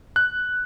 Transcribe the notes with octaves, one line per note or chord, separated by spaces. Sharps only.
F#6